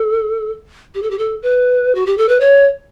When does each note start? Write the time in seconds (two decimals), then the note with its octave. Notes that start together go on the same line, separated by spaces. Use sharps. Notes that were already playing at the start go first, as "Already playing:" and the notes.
Already playing: A4
0.95 G4
1.03 A4
1.11 G4
1.18 A4
1.43 B4
1.95 F#4
2.06 G4
2.18 A4
2.29 B4
2.40 C#5